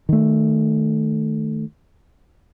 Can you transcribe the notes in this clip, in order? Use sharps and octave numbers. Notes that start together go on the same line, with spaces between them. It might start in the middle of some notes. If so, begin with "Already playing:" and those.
D#3 A3